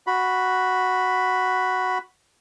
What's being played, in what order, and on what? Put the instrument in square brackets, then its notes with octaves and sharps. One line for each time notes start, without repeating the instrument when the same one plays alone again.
[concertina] F#4 B5